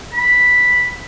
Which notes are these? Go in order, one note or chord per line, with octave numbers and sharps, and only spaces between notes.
B5